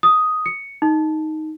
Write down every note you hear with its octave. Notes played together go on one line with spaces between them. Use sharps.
D#6
C#7
D#4